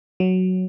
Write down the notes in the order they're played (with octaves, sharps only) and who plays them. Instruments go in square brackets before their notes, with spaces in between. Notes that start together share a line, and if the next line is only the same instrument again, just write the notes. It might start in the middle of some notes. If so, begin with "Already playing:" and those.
[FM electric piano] F#3